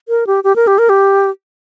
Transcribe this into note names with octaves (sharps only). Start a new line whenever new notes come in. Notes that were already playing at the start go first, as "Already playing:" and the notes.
A#4
G4
G4
A#4
G4
A#4
G4